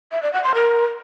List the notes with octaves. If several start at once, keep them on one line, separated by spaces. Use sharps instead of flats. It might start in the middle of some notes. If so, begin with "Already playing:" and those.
E5
D5
F#5
C6
A#4